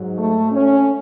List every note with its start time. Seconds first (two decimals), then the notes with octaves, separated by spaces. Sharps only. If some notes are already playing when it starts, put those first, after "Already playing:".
Already playing: G#2 F#3
0.18 A3
0.51 C#4